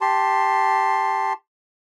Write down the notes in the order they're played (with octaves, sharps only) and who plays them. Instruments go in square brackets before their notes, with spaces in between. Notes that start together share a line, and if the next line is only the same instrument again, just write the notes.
[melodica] G4 A5 C6